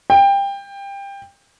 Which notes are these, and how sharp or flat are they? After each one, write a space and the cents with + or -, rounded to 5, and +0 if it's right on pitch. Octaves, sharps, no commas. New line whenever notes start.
G5 +20